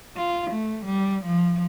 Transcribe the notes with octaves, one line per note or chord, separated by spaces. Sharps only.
F4
A3
G3
F3